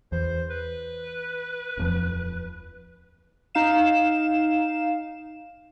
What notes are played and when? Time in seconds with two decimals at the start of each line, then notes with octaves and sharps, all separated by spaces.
0.12 E2 C5
0.50 B4
1.77 D#1 F2 F3
3.55 D#4 F5 E7